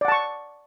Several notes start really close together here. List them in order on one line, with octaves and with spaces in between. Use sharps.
D5 F#5 A5 C#6